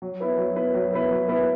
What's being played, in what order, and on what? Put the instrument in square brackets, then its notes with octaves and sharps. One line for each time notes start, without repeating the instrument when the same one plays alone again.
[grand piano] F#3
B3 E4 B4
F#3
B3 E4 B4
F#3
B3 E4 B4
F#3
B3 E4 B4